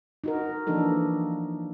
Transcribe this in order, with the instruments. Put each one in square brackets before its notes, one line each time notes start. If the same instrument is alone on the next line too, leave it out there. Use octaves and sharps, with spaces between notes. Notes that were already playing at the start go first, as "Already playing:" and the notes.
[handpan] D#4 F#4 A#4
E3 F3 A#3 D4 D#4 A4